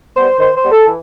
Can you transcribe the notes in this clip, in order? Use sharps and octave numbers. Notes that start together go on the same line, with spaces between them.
G3 B3 C5
D#3 C5
C5
G3 B3
A4
E3